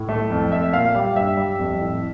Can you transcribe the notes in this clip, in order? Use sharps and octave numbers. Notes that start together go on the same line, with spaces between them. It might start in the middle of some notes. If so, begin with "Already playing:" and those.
Already playing: A2
A3
F2
A3 E5
A#2 F5
G3 F5
G2 E5
G3
F2
A2